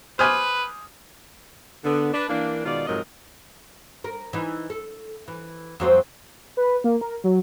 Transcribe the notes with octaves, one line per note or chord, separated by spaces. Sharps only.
B4 C5 G#5 D6 D#6 F6
D3 B3
D4 B4
E3 A#3 D4
B2 D#3 G#3 F4 D5
F2 G#2 C3 F#3 A#4 D#5
A#4
E3 D#4
A4
E3
F2 F#3 C4
B4
A#3
A#4
F#3